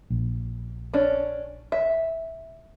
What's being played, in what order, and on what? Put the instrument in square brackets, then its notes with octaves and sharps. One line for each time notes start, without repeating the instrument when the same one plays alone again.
[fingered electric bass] A#1
[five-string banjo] C#4 D4
E5